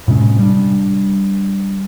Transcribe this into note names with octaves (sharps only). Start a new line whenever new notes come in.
A2 C3 G#3 C#4
G3 D4